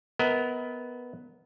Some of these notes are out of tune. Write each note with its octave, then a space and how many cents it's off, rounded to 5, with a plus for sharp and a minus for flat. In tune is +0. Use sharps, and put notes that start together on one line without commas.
B3 +0 A#4 +0 D#5 +40